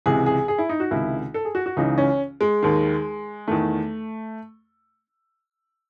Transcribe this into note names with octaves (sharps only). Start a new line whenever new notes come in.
C#2 C3 E3 G#4
G#4
G#4
E4
D#4
F#4
C#2 C3 D#3 E4
A4
G#4
F#4
F#4
C#2 C#3 E3 D#4
C#4
G#3
D#2 D#3
E2 D#3 A3